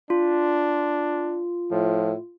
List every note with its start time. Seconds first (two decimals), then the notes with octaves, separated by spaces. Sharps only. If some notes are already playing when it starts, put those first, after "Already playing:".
0.10 D4 F4
1.71 A2 F3